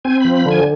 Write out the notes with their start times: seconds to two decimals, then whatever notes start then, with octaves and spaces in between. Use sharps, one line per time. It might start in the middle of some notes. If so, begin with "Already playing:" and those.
0.05 C4 G#5
0.20 F3 B5
0.35 B5
0.46 D3 G#5